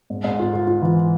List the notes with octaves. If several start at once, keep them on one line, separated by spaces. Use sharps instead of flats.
G#2
G#2
F4
F4
F4
E3